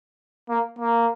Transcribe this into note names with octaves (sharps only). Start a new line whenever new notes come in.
A#3
A#3